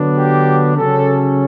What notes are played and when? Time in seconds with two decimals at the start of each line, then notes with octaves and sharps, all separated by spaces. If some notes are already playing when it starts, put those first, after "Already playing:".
Already playing: D3 F#3 B3 D4
0.17 G4
0.76 C#3 F#3 C#4 A4